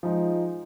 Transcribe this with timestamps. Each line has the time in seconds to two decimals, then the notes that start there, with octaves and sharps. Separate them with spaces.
0.03 F3 G#3 D#4